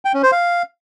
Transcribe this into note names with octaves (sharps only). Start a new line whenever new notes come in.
G5
C#4
C5
F5